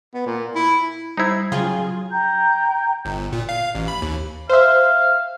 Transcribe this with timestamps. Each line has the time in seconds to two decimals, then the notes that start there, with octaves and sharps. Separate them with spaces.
0.14 B3
0.26 A#2
0.55 E4
1.17 G3 D#4 E4 C5 G#6
1.52 C#3 F#3 F4 G#4 G5 G#5
2.10 G5 A#5 G6
3.05 G1
3.32 A#2
3.49 F5
3.75 A1
3.88 B5
4.02 D#2
4.49 C5 E5 F5